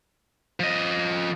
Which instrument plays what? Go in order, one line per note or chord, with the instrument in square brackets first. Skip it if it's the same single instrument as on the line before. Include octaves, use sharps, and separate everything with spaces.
[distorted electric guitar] F3 D#5